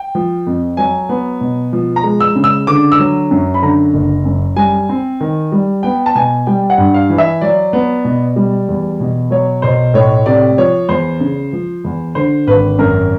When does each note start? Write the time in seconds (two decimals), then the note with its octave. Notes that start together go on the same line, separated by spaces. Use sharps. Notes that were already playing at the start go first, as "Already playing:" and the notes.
Already playing: G5
0.15 F3
0.46 F2
0.77 F#3 G#5
1.09 B3
1.41 B2
1.73 F3
1.96 A#5
2.04 G#3
2.20 E6
2.36 C#3
2.44 E6
2.67 D3 D6
2.92 E6
2.99 F#3
3.31 F#2
3.54 B5
3.62 D3 A#5
3.93 F#1
4.25 F#2
4.56 G3 G#5
4.89 C4
5.20 D#3
5.52 G3
5.83 B3 G5
6.06 A5
6.15 B2 G#5
6.47 G3 G5
6.70 F#5
6.78 G2
6.94 F5
7.10 E3
7.18 E5
7.41 F#3 D5
7.73 B3
8.05 B2
8.36 G3
8.69 E2
9.00 B2
9.31 F#3 C#5
9.62 B1 C5
9.94 A2 C#5
10.26 C3 D5
10.58 F3 C#5
10.89 E2 C5
11.20 C#3
11.53 F3
11.84 E2
12.15 D3 C5
12.47 G#1 B4
12.78 F#2 A#4